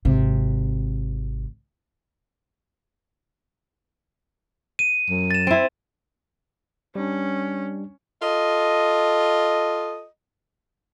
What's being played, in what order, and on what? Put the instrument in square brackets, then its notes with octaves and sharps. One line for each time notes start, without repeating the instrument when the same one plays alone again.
[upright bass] G#1 C3
[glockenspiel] D#7
[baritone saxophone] F#2
[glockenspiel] A6 E7
[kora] C4 E4
[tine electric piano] G3 D4 [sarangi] C#4
[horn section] F4 A4 D#5